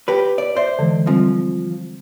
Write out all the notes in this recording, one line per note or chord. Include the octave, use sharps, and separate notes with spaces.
G4 B4
D5
C5 D5 E5
D3 E3 G#3
F3 G3 C4